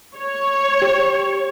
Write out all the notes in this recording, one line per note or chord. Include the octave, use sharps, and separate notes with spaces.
C#5
G4